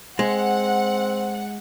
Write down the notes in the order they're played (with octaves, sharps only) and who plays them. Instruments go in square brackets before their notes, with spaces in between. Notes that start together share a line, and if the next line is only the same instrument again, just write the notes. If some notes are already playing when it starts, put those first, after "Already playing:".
[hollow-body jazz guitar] G#3 [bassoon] C4 [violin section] F#5